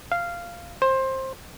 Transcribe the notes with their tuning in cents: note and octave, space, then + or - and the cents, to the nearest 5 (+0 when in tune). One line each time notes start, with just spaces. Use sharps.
F5 -10
C5 +20